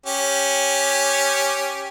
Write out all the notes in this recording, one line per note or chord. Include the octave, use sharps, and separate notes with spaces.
C#4 G4